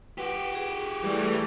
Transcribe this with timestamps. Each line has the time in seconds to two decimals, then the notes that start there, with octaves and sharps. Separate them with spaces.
0.18 F#4 G4 B4 F#5
0.55 G#4
1.03 E3 G3 A3